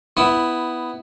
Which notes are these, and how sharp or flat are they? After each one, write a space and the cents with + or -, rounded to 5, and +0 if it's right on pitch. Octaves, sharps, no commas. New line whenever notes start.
B3 +10 E4 +0